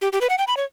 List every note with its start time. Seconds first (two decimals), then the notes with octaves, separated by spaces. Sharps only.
0.02 G4
0.13 G4
0.21 B4
0.30 F#5
0.38 G5
0.47 B5
0.57 C#5